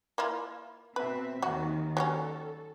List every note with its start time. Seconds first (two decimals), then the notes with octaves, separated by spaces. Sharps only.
0.18 A#3 E4 F4
0.96 B2 C4 B4 E5
1.42 D#2 D#3 F#3 F#4
1.97 F#3 G3 C#4 A4